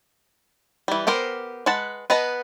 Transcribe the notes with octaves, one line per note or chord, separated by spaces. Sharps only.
E3 G3
B3 G4 A#4 C5
G#3 B4 F#5 A5
B3 B4 D#5 A5 A#5